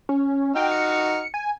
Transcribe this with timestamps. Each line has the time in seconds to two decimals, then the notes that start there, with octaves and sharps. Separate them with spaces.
0.09 C#4
0.56 D#4 F#4 G5 F6
0.71 C#7
1.34 G#5